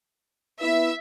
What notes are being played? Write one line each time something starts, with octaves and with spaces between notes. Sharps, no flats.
B3 E4 B4 E5